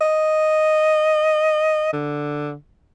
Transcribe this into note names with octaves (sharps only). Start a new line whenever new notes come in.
D#5
D3